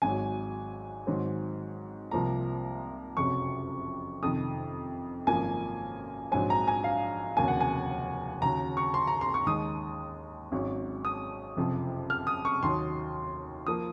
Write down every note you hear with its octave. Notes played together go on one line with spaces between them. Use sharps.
G#1 G#2 F#3 G#5
G#2 D#3 F#3 C4
C2 C3 F3 A#3 A#5
F#1 F2 C3 F#3 C#6
F2 C3 D#3 D#6
G#1 F#2 F3 A#3 G#5
A#1 G#2 F#3 C4 G#5
A#5
G#5
F5
F1 D#2 C#3 F#3 A#3 G#5
F#5
G#5
D#2 C#3 F#3 A#5
C#6
C6
A#5
C6
C#6
D#2 D#3 G#3 D#6
G#1 G#2 F#3 C#4
D#6
F#1 F2 C3 F3
F6
D#6
C#6
D#2 D#3 F#3 C6
F3 A#3 D#6